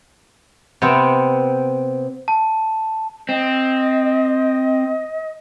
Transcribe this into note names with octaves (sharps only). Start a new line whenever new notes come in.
C3 B3 C4
A5
C4 D#5